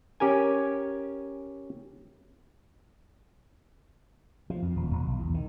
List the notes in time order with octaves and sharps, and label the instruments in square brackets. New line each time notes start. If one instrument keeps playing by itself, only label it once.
[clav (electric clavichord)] C#4 G4 A#4 G#5
[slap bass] F3
F2
D#1
D#1
B1
E2
D#3